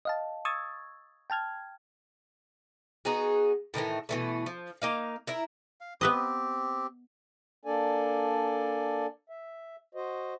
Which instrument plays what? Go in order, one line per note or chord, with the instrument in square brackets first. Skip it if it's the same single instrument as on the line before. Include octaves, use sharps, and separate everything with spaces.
[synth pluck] D#5 F5 A5
C#6 D#6 E6 G#6 A6
G5 A5 F6 G#6
[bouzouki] B3 D#4 F#4 G#4
A2 D#3 E3 A3
B2 E3 A3
F3
A#3 D#4 F5
E4 A#4 E5
[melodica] F5
[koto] B3 B4 D#5 [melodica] C4 G4
[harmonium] A#3 D4 A4 D5 G#5
E5
F#4 C5 D#5